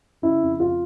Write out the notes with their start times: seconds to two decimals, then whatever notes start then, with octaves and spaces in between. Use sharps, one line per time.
0.22 C#3 E4
0.42 F2
0.60 F4